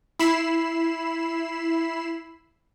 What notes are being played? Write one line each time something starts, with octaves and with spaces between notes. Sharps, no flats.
E4 B5 C7 E7